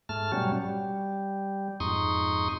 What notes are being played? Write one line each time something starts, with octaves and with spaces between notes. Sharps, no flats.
G#2 A3 A5 F6
B2 F#3 G3 C#4
G3
F2 G#2 D#4 C6 C#6 D#6